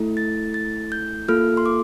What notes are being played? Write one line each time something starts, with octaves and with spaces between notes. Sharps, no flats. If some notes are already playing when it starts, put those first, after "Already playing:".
Already playing: A3 E4 A4
A6
A6
G6
A#3 F4 A4 F6
C6
D6